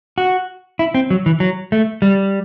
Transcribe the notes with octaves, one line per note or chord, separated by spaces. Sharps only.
F#4
E4
C4
F#3
E3
F#3
A3
G3